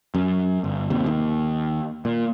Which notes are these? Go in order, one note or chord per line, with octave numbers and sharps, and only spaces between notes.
F#2
G1
D#2 C3
D#2
A#2